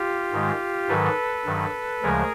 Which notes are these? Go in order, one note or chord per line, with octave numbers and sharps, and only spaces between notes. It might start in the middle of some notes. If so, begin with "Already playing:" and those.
Already playing: F4 G4
G#2 D#3 G#3
G#2 D#3 F#3 A4 B4
G2 D#3 F#3
D2 C#3 F3 G#3 G#4 A#4